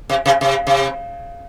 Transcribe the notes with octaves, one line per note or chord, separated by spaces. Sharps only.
C3
C3
C3
C3